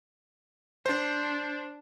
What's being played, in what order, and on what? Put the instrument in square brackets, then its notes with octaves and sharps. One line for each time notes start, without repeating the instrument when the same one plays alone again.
[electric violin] D4 [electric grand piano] C5